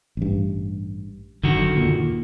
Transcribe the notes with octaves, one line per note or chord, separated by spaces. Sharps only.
A1 G2
F#1 F#2 D3 D#3 F#4
D#2 A#2